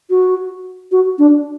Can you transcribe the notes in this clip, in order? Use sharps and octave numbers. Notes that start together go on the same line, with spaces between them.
F#4
F#4
D4